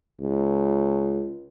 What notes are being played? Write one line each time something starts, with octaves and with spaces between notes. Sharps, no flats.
C#2